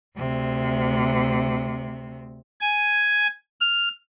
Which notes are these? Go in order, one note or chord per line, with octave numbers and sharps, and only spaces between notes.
D2 C3
G#5
F6